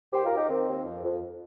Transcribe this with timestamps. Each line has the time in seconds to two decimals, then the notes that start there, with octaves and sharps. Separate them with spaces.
0.12 D#2 G4 C5
0.25 F4 A#4
0.31 D#2
0.37 D#4 G4
0.49 D#3 C4
0.68 D#2
0.85 F2
1.03 F2